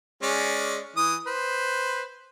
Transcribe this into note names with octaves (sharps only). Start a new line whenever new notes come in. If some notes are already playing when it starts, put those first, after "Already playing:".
G#3 C#4 D5
E3 D#6
B4 C5